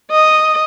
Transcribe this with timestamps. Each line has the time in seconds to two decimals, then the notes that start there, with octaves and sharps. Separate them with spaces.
0.11 D#5